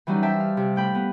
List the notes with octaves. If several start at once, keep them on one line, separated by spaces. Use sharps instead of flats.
E3 F#3 G3 C#4 D#4
C5 E5 G5 A5
F5
C3
A2 G5 B5
B3